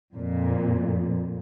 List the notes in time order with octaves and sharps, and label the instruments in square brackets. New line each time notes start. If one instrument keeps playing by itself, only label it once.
[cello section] F2 A#2